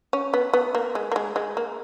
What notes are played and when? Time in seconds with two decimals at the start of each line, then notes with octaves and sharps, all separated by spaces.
0.13 C#4
0.34 B3
0.53 B3
0.75 A#3
0.95 G#3
1.12 A#3
1.16 G#3
1.36 G#3
1.57 A#3